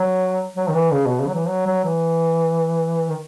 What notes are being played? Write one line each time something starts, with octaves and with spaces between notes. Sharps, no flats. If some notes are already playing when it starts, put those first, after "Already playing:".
Already playing: F#3
F#3
D#3
E3
C#3
B2
C#3
F#3
E3
F#3
F#3
E3
D#3